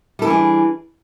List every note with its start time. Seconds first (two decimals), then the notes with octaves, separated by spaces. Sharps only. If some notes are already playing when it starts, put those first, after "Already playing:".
0.19 G3
0.22 A4
0.25 E3
0.27 G#4
0.30 D4